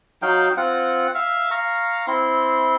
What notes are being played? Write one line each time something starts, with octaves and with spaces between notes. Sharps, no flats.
F#3 D#4 F5 G5
C4 F4 F#5
E5 F5
F5 A#5 C#6
C4 E4 C6